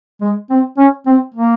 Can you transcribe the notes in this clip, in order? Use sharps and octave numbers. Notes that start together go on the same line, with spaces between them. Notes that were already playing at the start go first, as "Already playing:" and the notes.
G#3
C4
C#4
C4
A#3